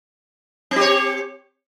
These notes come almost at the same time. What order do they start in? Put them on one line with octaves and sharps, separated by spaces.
C4 G4 C#5